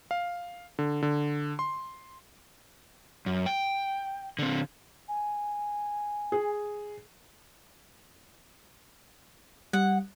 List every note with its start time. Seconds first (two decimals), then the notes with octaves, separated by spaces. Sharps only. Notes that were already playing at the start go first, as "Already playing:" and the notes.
0.11 F5
0.79 D3
1.02 D3
1.59 C6
3.26 F#2
3.46 G5
4.39 D3 C4
5.08 G#5
6.32 G#4
9.73 G3 F#5